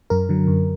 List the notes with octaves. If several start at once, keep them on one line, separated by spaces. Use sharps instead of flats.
F#2 A#4
D3 F#3
F#2